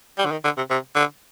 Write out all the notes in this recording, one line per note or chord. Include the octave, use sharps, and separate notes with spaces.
G3
D3
D#3
D3
C3
C3
D3